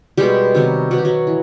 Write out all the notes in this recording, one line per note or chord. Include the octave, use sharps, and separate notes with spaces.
B2 G3 G#3 B3 G4
C3 D#3 F#3 B3
B2 F#3 B3 F#4
G4
F#3 F#4
E3